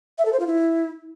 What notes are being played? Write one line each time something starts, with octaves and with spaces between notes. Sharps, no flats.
E5
A4
C5
F4
E4